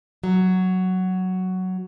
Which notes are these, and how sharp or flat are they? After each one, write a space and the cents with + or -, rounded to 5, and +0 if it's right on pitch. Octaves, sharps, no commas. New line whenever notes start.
F#3 +5